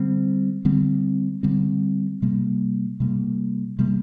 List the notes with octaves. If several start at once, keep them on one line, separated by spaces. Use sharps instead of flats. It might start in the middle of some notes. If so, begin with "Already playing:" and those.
Already playing: D3 G3 C4
D3 G3 C4
D3 G3 C4
C3 G3 A#3
C3 G3 A#3
C3 G3 A#3